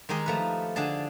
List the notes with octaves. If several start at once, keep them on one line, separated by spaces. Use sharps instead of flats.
D#3 G#3 D#4 G4 G#4
F3 A3 B4
D3 D4 G#4 A5